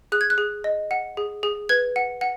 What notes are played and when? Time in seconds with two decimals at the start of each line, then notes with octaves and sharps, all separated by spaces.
0.12 G#4 F#6
0.21 G#6
0.30 F#6
0.38 G#4
0.64 D#5
0.91 F#5
1.17 G#4
1.43 G#4
1.69 B4 G#6
1.96 F#5
2.21 F#5